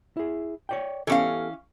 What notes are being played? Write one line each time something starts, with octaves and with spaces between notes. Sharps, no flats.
E4 G#4
C#5 D5 G5
E3 B3 C#4 G4 A4 F5